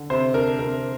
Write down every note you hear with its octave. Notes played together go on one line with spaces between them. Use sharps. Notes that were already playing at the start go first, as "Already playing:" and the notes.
Already playing: D3
C3 C5
D4 A#4
C3 A#4